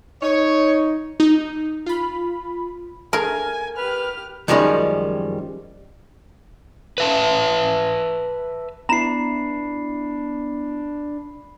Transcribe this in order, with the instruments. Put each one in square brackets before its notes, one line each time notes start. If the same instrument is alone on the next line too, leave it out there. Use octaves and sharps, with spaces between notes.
[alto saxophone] D#4 [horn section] C#5
[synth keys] D#4
F4 B5
[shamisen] A3 G#4 [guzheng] A#4 [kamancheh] G#5
[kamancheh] G4 F6 [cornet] B4
[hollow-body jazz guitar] F#2 D#3 F3 G3 G#3 C#4
[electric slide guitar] B4 E5 A5
[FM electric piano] B3 E4 [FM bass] D4 [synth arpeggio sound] A#5 E7 [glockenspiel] B5 C7